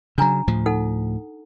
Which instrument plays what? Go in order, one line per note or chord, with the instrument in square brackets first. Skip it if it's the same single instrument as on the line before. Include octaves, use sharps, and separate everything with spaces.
[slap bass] C#3 F#3 [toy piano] D4 G#5 A#5
[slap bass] D2 A2 F3
[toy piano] D#4 A4 F#5